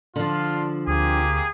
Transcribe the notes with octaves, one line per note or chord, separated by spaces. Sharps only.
D3 F3 D4 F4
D2 A#3 C4 G4 G#4